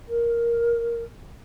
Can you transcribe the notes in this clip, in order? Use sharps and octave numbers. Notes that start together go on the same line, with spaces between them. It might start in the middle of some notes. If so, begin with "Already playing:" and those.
A#4